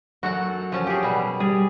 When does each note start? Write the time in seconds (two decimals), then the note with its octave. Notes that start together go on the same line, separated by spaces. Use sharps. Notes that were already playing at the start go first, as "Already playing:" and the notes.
0.23 F#2 F#4 A4 F#5
0.72 F3 C#4 A5
0.87 G4 G#4
1.03 B2 G3
1.40 G3 G#4